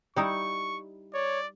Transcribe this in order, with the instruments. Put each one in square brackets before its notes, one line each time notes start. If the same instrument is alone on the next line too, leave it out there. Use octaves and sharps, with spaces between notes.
[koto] G3 D#4 E4 [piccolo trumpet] C#6
[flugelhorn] C#5 [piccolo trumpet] D5